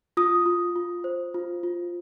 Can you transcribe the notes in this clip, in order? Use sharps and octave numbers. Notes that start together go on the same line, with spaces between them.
F4 D#6
F4
F4
C5
F4
F4